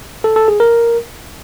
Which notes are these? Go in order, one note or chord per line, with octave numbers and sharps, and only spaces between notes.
A4
A4
G#4
A#4